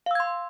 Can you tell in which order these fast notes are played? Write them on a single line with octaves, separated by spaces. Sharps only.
F5 E6 G#6 C6